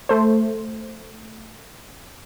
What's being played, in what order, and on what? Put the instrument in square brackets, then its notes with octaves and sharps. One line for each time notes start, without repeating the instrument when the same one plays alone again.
[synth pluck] A3 C5